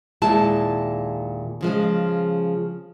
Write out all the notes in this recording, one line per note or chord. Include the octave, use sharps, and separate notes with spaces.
D#2 A#2 G#3 E4 A5
C#3 F3 G#3